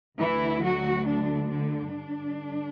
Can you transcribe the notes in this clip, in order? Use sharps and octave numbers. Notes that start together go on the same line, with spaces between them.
D2 D3 E3 E4
F#3 F#4
D3 D4
D3 D4
G2 D3